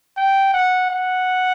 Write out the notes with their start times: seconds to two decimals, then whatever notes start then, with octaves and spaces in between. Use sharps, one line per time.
0.17 G5
0.54 F#5
0.90 F#5